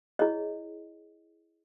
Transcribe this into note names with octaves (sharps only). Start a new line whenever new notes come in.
E4 G#4 C#5 D#5